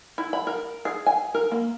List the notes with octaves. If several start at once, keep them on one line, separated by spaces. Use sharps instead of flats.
E4
B5
A#4
G#4
G#5
A#4
A#3